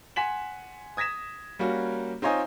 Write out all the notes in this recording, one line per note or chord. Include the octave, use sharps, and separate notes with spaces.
F#5 G#5 C6 B6 E7 F#7
D#6 G#6 A#6 B6 E7
G3 A#3 C#4 F#4
C4 D#4 F4 C#5 D#5 G#5